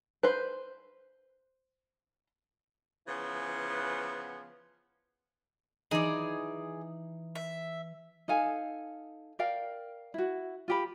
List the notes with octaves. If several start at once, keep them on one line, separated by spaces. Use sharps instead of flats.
B4 C5
C#3 E3 F3 B3
E3 D#4 G#4 D5
E5
D#4 A4 F5 G#5
A#4 D5 F5 G5
E4 F#4
F4 G4 B5